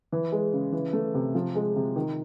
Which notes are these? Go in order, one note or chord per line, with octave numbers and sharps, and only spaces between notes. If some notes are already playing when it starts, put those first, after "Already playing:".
E3
G#3
C#3
E3
A3
C3
F3
G#3
C3
D#3